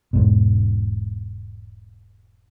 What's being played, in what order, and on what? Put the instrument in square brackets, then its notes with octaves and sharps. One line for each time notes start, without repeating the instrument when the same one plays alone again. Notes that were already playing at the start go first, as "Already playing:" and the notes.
[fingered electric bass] E1 G#2 B2